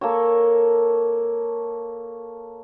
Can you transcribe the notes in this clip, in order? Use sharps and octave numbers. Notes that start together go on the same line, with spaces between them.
A#3 A4 C#5